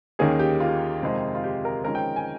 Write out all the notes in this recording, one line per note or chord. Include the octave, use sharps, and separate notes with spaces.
D#2 D#3 A#3 C#4 G#4
G4
F4
F2 C3 D#3 G#3
F4
G4
A#4
F2 D#3 G#3 C#4 A#4
G5
G#5